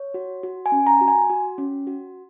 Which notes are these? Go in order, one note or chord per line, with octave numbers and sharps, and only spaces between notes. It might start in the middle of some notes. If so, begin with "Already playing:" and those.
Already playing: C#5
F#4
F#4
G#5
C#4
A#5
F#4
G#5
F#4
C#4
F#4